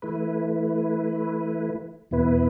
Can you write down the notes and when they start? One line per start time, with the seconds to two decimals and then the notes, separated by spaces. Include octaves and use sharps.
0.02 E3 A3 E4 B4
2.11 E2 B2 B3 E4 B4